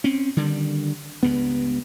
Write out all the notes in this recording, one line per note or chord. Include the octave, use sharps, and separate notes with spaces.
C4 C#4
D3 D#3 G3
C#2 G2 B3